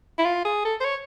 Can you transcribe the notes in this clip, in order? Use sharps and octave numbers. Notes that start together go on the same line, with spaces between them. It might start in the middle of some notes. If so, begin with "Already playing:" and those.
E4
F4
G#4
A4
C5
C#5